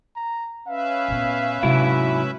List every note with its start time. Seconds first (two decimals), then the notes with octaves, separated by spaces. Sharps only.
0.16 A#5
0.68 C#4 B4 E5 F5
1.08 A#2 B3
1.63 G#2 C3 F#3 E4